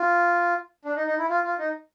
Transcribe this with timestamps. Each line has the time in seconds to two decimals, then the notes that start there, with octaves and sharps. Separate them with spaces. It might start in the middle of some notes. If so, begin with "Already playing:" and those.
Already playing: F4
0.85 D4
0.96 D#4
1.07 D#4
1.18 E4
1.30 F4
1.44 F4
1.59 D#4